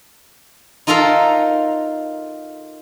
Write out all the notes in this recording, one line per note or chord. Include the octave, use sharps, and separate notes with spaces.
D#4 F4 A4 A#4 F5 A#5